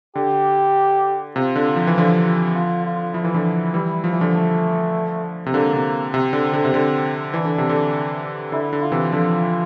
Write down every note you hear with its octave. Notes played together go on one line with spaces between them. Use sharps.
D3 G4
C3 F4
D3
F3
E3
D3 F3
F4
F4
F3 E4
E3
D3 F3
E3 G3
F3
E3
D3 F3
A3
C3
D3 A#3
C3
C3 C4
D3
D3
C3
D3
E3 D4
D3
C3
D3
D3 E4
D3
F4
C3 E3
D3 F3